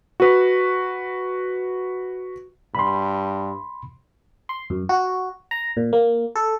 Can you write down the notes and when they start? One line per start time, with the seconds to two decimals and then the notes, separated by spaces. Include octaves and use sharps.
0.20 F#4 B4
2.75 G2 B5 C6
4.49 C6
4.70 F#2
4.89 F#4
5.51 A#5
5.77 A#2
5.93 A#3
6.35 A4